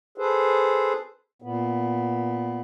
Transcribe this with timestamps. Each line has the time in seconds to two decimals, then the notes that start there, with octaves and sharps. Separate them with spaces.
0.18 G#4 A4 B4 C5
1.42 A#2 B3